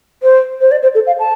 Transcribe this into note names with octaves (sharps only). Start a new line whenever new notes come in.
C5
C5
D5
C5
A4
F5
A5